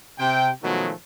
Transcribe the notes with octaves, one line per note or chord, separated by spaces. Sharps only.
C3 G5
B2 D#3 F3 F#3 G#3 A3